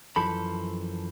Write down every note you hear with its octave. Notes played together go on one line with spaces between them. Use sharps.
F#2 E3 F3 A4 B5